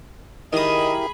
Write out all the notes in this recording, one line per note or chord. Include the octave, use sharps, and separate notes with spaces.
D#3 E4 G4 G#4 A#4 D#5 B5 D#6